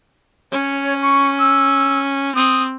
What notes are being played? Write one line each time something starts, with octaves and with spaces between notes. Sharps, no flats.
C#4 C#5
C#6
E6
C4 D#6